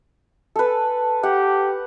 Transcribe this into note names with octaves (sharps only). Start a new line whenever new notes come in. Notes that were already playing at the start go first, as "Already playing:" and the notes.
A4 B4
G4 F#5